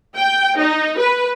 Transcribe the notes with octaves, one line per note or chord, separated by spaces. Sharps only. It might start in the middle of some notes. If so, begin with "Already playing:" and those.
G5
D#4
B4